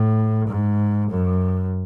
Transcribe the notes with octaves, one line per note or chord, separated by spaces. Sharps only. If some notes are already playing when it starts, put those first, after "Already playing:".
Already playing: A2
G#2
F#2